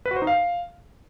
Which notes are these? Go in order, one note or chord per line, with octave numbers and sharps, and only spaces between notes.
B4
F#4
C5
D#4
F5